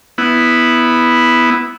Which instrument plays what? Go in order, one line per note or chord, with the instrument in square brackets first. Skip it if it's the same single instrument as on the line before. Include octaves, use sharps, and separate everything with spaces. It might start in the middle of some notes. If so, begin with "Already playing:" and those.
[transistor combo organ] B3 E4